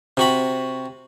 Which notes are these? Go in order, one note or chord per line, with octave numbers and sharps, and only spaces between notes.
C3 F#4 B5